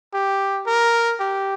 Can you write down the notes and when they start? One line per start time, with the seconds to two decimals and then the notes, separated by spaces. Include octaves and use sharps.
0.14 G4
0.66 A#4
1.20 G4